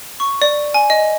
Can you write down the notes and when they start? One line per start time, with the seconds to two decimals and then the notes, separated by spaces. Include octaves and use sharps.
0.20 C#6
0.42 D5
0.74 G#5
0.90 D#5